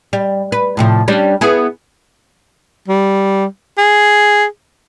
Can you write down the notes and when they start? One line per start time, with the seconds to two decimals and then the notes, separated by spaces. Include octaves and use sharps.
0.13 G3
0.52 B4
0.77 A2 C3 F3
1.08 G3 C#4 D4
1.41 B3 E4 G#4
2.88 G3
3.78 G#4